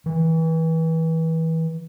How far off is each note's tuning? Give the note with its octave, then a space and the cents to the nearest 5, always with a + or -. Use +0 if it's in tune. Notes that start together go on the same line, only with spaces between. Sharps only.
E3 -25